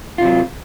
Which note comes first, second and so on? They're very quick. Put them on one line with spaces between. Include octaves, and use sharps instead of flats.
F4 C3 F#3